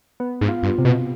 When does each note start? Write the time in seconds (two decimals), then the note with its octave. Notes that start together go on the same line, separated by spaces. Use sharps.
0.20 B3
0.41 G#2
0.48 F4
0.63 G2
0.78 C3
0.85 B2